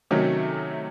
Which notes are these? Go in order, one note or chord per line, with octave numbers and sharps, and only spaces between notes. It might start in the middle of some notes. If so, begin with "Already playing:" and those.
C3 D#3 F#3 A3 C#4